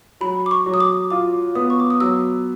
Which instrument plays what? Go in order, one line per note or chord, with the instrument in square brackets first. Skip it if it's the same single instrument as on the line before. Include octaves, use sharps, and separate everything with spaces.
[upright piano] F#3 [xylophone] B5
[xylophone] D6
C#6
[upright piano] F#3
[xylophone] D#6
D6
[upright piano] F4 [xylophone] D6
[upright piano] B3 [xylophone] D#6
[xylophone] C#6
D6
D#6
[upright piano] F#3 [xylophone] E6